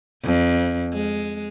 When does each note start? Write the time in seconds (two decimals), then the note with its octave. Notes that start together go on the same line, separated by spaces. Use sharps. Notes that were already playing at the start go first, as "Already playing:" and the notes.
0.24 F2
0.93 G#3